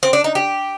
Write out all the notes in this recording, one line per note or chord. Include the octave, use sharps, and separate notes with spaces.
C4
D4
D#4
G4